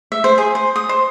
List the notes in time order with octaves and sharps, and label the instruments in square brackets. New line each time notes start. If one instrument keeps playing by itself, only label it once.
[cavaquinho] E5
C5
G#4
C5
D#6
C5